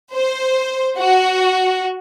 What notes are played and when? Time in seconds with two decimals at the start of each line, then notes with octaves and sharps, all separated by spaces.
0.13 C5
0.97 F#4